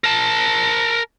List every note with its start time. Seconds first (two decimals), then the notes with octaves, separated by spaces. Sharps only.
0.04 A#4 A5